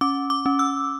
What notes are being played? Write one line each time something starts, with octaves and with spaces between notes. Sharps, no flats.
C#4 D6
D6
C#4
E6